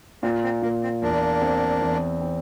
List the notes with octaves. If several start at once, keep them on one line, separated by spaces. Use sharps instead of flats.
A#2 C4
C4
A#2 A#3
C4
E2 A#3 D4
C4
E2
C4